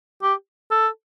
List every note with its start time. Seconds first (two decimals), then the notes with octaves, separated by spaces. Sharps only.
0.23 G4
0.71 A4